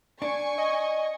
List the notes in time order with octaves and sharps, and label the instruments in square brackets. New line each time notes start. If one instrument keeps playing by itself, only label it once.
[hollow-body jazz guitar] D4 [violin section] G#5 C#6
[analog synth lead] D#5